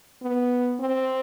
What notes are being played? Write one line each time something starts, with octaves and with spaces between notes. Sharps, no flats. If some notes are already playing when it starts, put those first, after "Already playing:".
B3
C4